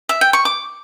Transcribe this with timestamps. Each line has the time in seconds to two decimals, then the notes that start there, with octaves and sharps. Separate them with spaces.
0.09 E5
0.21 G5
0.33 C#6
0.45 D6